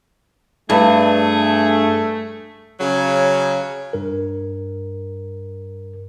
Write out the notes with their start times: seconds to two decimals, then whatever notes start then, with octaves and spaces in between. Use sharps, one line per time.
0.70 G2 A3 G#4
2.80 C#3 F#3
3.93 G2 A#4